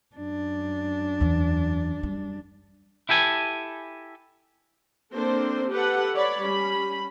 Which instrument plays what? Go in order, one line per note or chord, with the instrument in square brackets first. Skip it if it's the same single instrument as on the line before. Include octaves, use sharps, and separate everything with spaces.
[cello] F#2 D4
[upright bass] E2 E3
G3
[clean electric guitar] E4 G4 A4 G#5
[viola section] A#3 C4 D4 A4 C5
G4 A4 B4 F#5
C#5 D5 B5
G3 C#4 B5